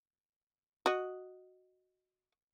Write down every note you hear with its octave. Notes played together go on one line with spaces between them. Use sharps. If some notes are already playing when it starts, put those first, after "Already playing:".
F#4 D#5